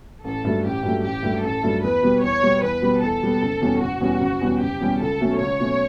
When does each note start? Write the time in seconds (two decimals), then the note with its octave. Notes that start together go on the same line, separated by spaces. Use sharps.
0.24 A1 A4
0.45 G2 F#3 A3
0.64 A1 G4
0.83 G2 F#3 A3
1.03 A1 G4
1.23 G2 F#3 A3
1.43 A1 A4
1.63 G2 F#3 A3
1.83 E2 B4
2.03 B2 G3 B3
2.22 E2 C#5
2.42 B2 G3 B3
2.62 E2 B4
2.82 B2 G3 B3
3.02 E2 A4
3.22 B2 G3 B3
3.42 F#1
3.61 E2 B2 G3 C#4
3.81 F#1 F#4
4.01 E2 B2 G3 C#4
4.21 F#1
4.41 E2 B2 G3 C#4
4.60 F#1 G4
4.80 E2 B2 G3 C#4
5.00 C#2 A4
5.20 B2 F#3 A3 C#4
5.39 C#2 C#5
5.60 B2 F#3 A3 C#4